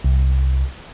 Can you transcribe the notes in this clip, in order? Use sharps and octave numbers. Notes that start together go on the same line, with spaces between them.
C2